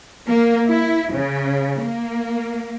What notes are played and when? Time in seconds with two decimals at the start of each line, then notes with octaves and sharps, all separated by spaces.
0.27 A#3
0.69 E4
1.13 C#3
1.82 A#3